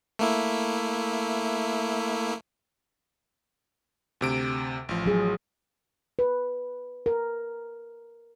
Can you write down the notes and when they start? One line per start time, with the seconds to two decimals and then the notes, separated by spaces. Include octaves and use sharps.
0.19 A3 A#3 E4
4.21 D2 C3 D7
4.89 A1 F3
5.06 F#3 G#4
6.19 B4
7.06 A#4